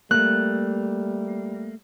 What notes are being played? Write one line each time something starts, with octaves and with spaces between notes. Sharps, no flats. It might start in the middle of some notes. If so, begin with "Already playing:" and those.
G3 A3 A#3 F#6